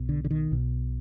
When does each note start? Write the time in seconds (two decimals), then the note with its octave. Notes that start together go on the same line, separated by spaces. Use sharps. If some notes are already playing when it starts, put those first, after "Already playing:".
Already playing: B1 B2
0.09 D3
0.25 D3
0.31 D#3
0.51 B1 B2